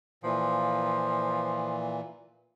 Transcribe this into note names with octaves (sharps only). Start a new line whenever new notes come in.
A#2 E3 F3